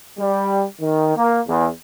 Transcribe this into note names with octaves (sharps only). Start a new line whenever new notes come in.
G3
D#3
A#3
E2